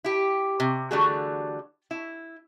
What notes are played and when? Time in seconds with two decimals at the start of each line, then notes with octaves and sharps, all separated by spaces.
0.04 E4 G4
0.60 C3
0.91 D3 E3 G3 A3 F#4 G#4
1.91 E4